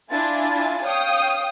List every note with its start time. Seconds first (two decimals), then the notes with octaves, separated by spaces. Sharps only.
0.12 D4 E4 F4 G#5 A6
0.84 C#5 F5 G5 D#6